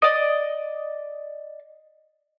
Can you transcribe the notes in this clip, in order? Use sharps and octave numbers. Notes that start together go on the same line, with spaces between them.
D5 D#5